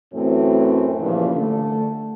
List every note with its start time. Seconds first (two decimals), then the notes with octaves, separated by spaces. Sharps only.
0.13 F#2 A2 E3 A3 C4
1.00 G2 A#2 C#3 E3 F3
1.35 D3 A3